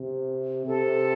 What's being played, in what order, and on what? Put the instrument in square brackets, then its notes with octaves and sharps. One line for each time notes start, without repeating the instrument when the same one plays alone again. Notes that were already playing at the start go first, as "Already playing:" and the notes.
Already playing: [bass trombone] C3
[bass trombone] C3 [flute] A4